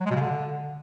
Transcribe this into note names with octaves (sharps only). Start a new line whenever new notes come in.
F#3
G#3
B2
C#3
D3